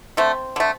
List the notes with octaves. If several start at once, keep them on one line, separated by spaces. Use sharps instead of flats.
D3 A3 C4
D3 A3